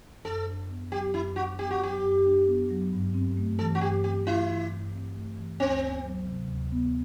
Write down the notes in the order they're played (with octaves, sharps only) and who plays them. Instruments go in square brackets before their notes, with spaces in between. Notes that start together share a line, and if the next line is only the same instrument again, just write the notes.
[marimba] F#2 [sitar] A4
[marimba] D4
B3
[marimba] F#3 [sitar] G4
[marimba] F#2 [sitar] E4
[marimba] D4 [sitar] F#4
[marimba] B3 [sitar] G4
[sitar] F#4
[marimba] F#3 [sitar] G4
[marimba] F#2
D4
B3
F#3
G2
C4
A3
[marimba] E3 [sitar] A4
[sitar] F#4
[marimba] G2 [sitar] G4
[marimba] C4 [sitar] G4
[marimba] A3 [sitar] E4
[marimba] E3
G2
C4
A3
E3
[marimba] D2 [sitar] C4
[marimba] B3
F#3
C3
D2
B3